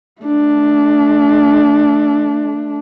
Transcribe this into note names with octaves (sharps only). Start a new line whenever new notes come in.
A3 D4